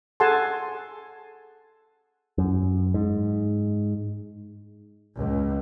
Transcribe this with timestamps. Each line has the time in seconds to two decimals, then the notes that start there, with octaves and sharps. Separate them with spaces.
0.20 G#4 A4 F#5 G#5 A5 C6
2.38 F#2
2.94 G#2
5.17 C#2